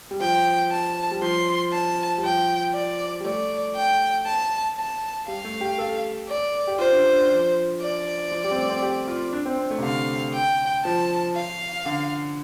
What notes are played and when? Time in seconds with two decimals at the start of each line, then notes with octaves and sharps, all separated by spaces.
0.11 G3
0.21 F3 G5
0.71 A5
1.11 G3
1.22 F3 C6
1.72 A5
2.18 G3
2.23 F3 G5
2.74 D5
3.20 G3
3.24 A3 D5
3.75 G5
4.26 A5
4.76 A5
5.27 G3 F5
5.44 A3
5.61 G4
5.78 A4
6.29 D5
6.67 G4
6.79 F4 C5
6.92 D4
7.05 D4
7.17 D4
7.30 F3
7.81 D5
8.31 F3
8.44 G3
8.51 C4
8.56 A3
8.70 C4
8.83 G4
9.08 F4
9.33 D4
9.46 C4
9.58 C4
9.71 A3
9.78 C3
9.83 D3 F5
10.33 G5
10.85 F3 A5
11.36 F5
11.85 D3